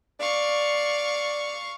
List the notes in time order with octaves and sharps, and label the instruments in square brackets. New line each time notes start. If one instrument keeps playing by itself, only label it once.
[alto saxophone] D5 [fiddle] F5 C#6